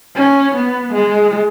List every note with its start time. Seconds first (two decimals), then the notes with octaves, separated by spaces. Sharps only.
0.15 C#4
0.55 B3
0.93 G#3